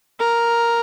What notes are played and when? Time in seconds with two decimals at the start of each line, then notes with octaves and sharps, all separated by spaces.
0.20 A#4